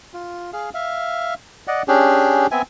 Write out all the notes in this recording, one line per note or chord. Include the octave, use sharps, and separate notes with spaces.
F4
G#4 F5
E5 F5
D5 D#5 F#5
C#4 D4 G4 G#4
B3 C4 E5 G#5